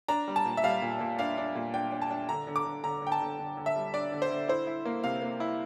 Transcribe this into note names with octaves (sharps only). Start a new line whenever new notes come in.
D4 A#5
G3
A5
A#2
E5
G3 F5
A#2
A#2
D4 F5
D4
A#2
D4 G5
D4
A5
D4
D3 A#5
D3
D6
D3
D3 A#5
D3 G5
A5
D3
D3
D3
E5
G3
D4 D5
D3
C5
D3
E4 C5
E4
A#3
C3 F5
A#3
E4